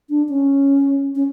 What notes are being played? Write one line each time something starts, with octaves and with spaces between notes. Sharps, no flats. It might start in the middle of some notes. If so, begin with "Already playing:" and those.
D4
C#4
C#4